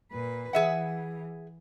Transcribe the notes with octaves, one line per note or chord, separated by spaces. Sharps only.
A#2 B4
E3 G#4 E5 F#5